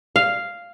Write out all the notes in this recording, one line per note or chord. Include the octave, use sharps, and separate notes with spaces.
F5